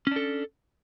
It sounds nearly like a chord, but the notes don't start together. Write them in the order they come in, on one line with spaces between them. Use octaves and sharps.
C#4 D4 A4